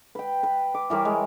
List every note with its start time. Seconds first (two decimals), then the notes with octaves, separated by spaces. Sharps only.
0.15 B4 G5
0.43 B4
0.74 D6
0.90 E3 G3 A#4 C#5
1.05 G#3